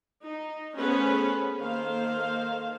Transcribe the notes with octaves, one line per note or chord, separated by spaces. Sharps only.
D#4
A3 B3 C#4 G#4 B4 C5
D#3 A#3 A4 C5 F5